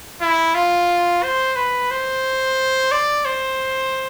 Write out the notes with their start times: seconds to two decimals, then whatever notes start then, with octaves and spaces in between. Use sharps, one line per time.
0.21 E4
0.55 F4
1.23 C5
1.56 B4
1.90 C5
2.91 D5
3.25 C5